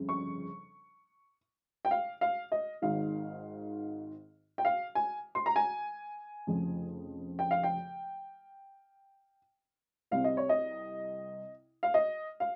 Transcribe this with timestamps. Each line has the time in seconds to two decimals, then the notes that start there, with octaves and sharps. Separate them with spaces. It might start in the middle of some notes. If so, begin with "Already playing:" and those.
Already playing: G1 F2 C#3
0.09 C#6
1.85 G5
1.91 F5
2.21 F5
2.52 D#5
2.82 G#1 G#2 D#3 F5
4.58 G5
4.65 F5
4.95 G#5
5.35 C6
5.46 A#5
5.56 G#5
6.47 F1 F2 C#3 F3
7.39 G5
7.51 F5
7.63 G5
10.11 C2 C3 G3 C4 F5
10.24 D#5
10.37 C#5
10.49 D#5
11.83 F5
11.94 D#5
12.40 F5